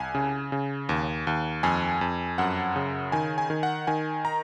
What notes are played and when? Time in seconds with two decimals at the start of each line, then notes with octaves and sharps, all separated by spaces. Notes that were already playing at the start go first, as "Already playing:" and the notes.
Already playing: C2 G#5
0.15 C#3
0.52 C#3
0.89 D#2
1.27 D#2
1.63 F2 G#5
2.01 F2
2.38 F#2 F#5
2.76 C#3
3.12 D#3 G#5
3.38 G#5
3.50 D#3
3.63 F#5
3.87 D#3 G#5
4.25 A#5